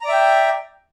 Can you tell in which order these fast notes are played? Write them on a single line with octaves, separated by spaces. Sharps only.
A#5 D5 E5 G5